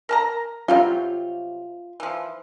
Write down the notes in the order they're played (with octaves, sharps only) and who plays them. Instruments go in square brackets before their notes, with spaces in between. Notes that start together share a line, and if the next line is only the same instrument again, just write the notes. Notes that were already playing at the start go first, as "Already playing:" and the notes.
[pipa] A#4 A5 A#5
[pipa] C3 F#3 G3 [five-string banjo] F4
[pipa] E3 F3